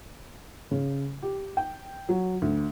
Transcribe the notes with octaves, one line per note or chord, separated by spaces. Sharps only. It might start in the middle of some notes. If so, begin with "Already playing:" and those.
C#3
G4
G5
F#3
D2